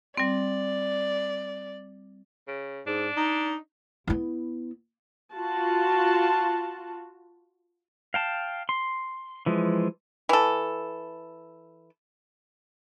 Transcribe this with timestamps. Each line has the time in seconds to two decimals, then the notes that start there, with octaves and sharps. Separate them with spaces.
0.17 G3 C4 D5
2.47 C#3
2.87 G#2 D4
3.17 D#4
4.07 B3 E4
5.33 F4 F#4 A5
8.14 F5 G5 A5
8.69 C6
9.46 E3 F3 G#3
10.29 E3 A4